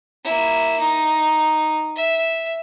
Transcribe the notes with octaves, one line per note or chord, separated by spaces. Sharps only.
A#3 E4
D#4
E5